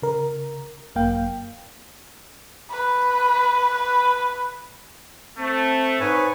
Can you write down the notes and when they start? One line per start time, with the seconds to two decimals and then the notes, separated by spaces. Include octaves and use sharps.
0.02 C#3 A#4
0.95 G#1 F#2 A#3 F5 G5
2.71 B4
3.74 B4
5.38 A3 C4
6.00 G#2 B4 C#5 G#5